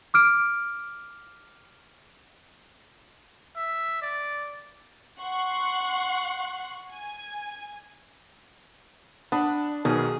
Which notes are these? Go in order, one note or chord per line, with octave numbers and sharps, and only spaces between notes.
D6 F6 D7
E5
D5
F#5 C6 C#6 F#6 C7
G#5
D4 F#5 B5 D#6
B1 B2 D#3 G#4